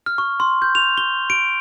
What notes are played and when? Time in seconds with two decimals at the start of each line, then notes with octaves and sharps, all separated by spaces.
0.06 F6
0.18 C#6
0.40 C6
0.62 G6
0.75 F7
0.97 G7
1.30 D7